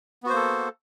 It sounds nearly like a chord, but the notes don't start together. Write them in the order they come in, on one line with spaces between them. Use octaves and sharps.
B3 F#4 C5 A#3 A4